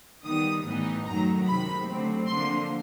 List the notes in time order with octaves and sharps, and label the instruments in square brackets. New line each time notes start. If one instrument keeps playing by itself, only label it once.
[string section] D#3 G3 B3 D#6
A2 E3 G3 B3 D#4
F#2 D#3 F#3 A3 A#5
C3 D#3 G#3 B5
D3 F#3 A3 C4
D3 F3 A#3 C6